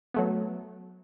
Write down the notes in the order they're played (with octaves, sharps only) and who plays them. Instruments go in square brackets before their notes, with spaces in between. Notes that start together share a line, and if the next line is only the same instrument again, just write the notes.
[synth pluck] F#3 A3 B3